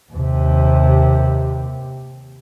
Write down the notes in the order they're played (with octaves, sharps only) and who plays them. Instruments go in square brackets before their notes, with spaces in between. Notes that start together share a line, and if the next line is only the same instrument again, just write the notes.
[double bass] D#2 C3